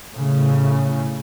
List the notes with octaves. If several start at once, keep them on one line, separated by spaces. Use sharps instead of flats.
A2 C#3